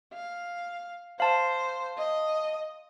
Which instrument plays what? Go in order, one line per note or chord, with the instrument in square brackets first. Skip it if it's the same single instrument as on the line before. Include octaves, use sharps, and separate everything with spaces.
[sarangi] F5
[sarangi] C5 [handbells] F5 A5
[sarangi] D#5